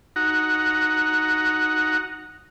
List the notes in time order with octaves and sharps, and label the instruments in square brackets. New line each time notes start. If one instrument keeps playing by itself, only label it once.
[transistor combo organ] D#4 F#4 F#5 A#5